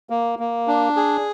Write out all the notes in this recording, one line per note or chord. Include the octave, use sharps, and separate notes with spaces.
A#3
A#3
D4
G#4